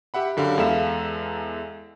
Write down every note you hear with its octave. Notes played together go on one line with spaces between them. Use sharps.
G4 E5 F#5 B5
F#2 D3 G4 F5 B5
E2 G#3 A4 E5 F5 E7